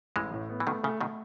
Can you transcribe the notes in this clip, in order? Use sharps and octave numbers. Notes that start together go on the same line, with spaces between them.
A1 E3 G#3
A2
B3
E3
B2 D#3 A3
C#3 A3
B2 D#3 A3